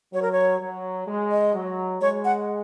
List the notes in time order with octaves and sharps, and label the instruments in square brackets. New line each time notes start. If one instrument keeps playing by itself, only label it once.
[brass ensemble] F#3 [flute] C#5
[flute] A#4
C#5
[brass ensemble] F#3
G#3
[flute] D#5
[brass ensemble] F#3
[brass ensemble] G#3 [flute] C#5
[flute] F#5